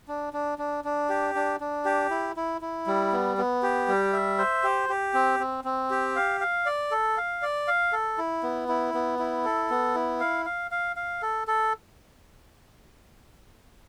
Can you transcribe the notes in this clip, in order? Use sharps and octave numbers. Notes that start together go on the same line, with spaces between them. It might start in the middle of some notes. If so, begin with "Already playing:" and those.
D4
D4
D4
D4
G4
D4
D4
G4
E4
E4
E4
G3
B3
B3
G4
G3
E5
C5
G4
G4
C4
C4
C4
G4
F5
F5
D5
A4
F5
D5
F5
A4
E4
B3
E4
B3
E4
A4
B3
E4
F5
F5
F5
F5
A4
A4